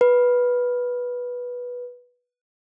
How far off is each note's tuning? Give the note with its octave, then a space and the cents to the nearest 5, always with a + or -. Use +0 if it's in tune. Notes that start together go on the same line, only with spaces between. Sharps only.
B4 -10